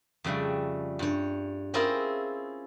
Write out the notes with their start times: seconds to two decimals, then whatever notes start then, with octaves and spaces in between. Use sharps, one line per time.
0.24 F2 C#3 G3 A3
0.99 G2 C#5
1.74 C4 C#4 E4 F4 G#4 A#4